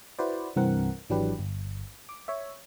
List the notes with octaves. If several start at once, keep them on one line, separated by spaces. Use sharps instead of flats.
E4 F#4 B4 C5 D5
C2 G2 E3 C4 A#4 F#5
G#1 E3 F#3 D4 G4 B4
G1
D6
C#5 E5